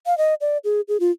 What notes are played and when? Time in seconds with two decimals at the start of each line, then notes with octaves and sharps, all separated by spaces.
0.06 F5
0.18 D#5
0.41 D5
0.64 G#4
0.88 G#4
1.00 F4